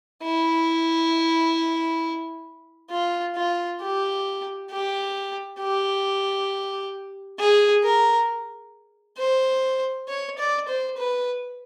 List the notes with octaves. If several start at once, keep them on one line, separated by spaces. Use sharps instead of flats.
E4
F4
F4
G4
G4
G4
G#4
A#4
C5
C#5
D5
C5
B4